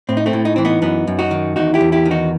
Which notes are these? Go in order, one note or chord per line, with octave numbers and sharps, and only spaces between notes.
A2 C4
D#4
A3 C4
A2
D#4
E3 C4
B3 D#4
F#2 B3 D#4
F#2
D#4 F#4
D#3
E2 D#4 F#4
E4 G4
E2
E4 G4
D#3
D#4 F#4